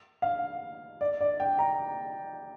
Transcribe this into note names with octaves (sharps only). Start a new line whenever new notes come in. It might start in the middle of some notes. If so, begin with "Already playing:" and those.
F5
D5
D5
G5
A#5